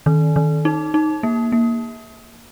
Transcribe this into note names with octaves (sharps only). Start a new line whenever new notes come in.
D#3
D#3
D#4
D#4
A#3
A#3